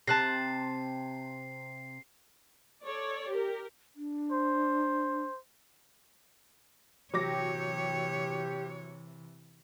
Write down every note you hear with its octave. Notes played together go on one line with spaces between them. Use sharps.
C3 A5 F#6 A#6 C7
A4 C#5 D5
G4 A#4
D4
C5
C3 E3 F#3 G4 C#5 D6 A#6